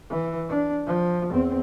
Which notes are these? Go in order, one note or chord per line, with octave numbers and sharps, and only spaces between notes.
E3
D4
F3
E2 C4